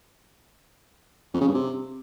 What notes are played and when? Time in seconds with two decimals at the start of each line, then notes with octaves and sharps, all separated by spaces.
1.34 F2
1.41 C#3
1.48 G2
1.54 C3